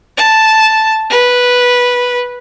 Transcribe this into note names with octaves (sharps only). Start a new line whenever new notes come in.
A5
B4